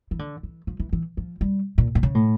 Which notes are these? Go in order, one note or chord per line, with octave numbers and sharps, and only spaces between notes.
E3
D3
E3
F3
E3
E3
F3
G3
A#2
A#2
C#3
A2